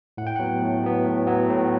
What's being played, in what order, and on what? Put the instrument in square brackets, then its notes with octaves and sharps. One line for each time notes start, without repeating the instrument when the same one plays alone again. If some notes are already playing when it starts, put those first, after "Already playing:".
[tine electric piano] A2 F#5
G5
F#3 B3 F#5
A2
F#3 B3
A2
F#3 B3
A2